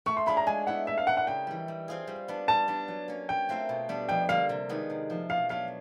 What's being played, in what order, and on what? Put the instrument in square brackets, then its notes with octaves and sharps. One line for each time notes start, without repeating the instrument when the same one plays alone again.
[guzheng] A3 [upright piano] C#6
[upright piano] C6
[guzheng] D4 F4 G#4 C#5 [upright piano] B5
[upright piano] A#5
[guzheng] G#3 [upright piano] G#5
[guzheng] B3 E4 [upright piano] F#5
[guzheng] A3 [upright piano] E5
[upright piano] F5
[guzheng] D4 F4 A#4 [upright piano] F#5
[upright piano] F#5
[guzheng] C#3 [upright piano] G5
[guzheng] E3 G3
G3
C4 F4 G#4
G3
B3 D4
[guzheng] G3 [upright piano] A5
[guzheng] B3 D4
F#3
A#3 C#4
[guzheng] F#3 [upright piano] G5
[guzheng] A3 C4 F4 A#4
B2
G3 B3 D4
[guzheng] F2 [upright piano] G5
[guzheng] D3 G3 A#3 [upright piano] F5
[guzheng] C3
D#3 G#3 B3
C3
F3 A3
[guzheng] B2 [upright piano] F5
[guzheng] F#3 B3 D4 [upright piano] F5